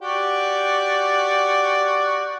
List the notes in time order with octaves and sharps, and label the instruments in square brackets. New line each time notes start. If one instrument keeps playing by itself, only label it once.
[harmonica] F#4 G4 D5